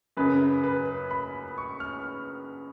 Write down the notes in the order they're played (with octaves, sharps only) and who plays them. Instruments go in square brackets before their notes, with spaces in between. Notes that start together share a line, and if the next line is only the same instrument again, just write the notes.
[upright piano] F#2 C#3 B4
B4
B5
C#6
F6